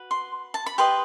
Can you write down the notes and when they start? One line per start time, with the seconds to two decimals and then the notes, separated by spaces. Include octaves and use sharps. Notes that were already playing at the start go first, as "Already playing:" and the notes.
Already playing: F#4 B4
0.11 C6
0.54 A5
0.66 B5
0.78 G4 B4 D#5 C6